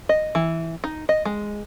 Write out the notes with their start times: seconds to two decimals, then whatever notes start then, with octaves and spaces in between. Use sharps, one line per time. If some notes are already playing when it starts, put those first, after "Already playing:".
0.09 D#5
0.35 E3
0.84 D#4
1.09 D#5
1.25 G#3